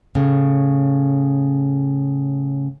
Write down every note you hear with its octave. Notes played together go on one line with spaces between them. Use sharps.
A2 C#3